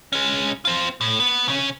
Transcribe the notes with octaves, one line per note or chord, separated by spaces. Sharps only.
G#3 C#4
C4 F4
A2
B3
C#3 C#4